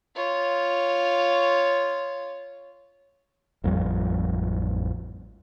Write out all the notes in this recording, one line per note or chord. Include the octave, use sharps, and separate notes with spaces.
F4 C#5
A1 F2 F3 G3